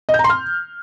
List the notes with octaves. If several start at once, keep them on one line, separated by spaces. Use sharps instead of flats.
D#5
G6
A#5
C6
F6